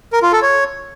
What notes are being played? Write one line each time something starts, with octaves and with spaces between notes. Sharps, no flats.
A#4
F4
A4
C#5